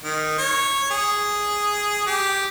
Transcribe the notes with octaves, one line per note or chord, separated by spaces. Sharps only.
D#3
C#5
G#4
G4